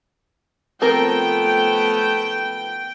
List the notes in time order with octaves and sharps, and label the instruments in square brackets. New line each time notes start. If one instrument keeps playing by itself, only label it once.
[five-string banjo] F3 C4 A#4 [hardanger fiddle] A3 B3 [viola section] G5